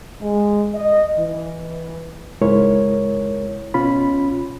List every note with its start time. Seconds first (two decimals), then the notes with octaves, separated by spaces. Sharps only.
0.21 G#3
0.75 D#5
1.17 E3
2.41 C#2 G#2 G#3 E4 A#4 C#5
3.74 B2 C#4 F4 B5